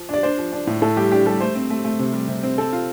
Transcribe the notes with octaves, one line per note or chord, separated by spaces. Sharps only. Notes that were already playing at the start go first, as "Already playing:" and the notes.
Already playing: F3
D4 D5
D4 C5
F3
D4
A2
A2 A4
G3 G4
D4 G4
G3 A4
A3 C5
C4
A3
A3
C3
G3
C3
C4
C4 A4
F4